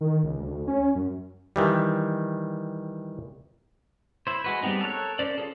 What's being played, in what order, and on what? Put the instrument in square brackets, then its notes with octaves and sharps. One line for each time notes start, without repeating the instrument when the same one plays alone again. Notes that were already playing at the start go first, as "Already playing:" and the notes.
[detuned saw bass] D#3
C#2
D2
C#4
F#2
[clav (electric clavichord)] D#3 E3 G3
[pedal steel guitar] E4 C5
G#3 F#4 B4
G3 G#3 B3 C4 D#4
A4 A#4 C#5 F#6
C#4 A#4 C5 D5
F4 G#4 A4